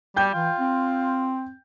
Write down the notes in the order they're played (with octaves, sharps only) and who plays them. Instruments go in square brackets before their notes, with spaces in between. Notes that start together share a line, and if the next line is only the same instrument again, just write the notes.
[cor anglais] G3 [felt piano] G5 G6
[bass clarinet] E3 [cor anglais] F4
[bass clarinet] C4